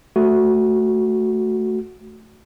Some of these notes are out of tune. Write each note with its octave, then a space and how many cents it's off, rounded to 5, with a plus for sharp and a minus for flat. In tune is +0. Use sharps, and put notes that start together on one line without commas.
A3 +0 F#4 +0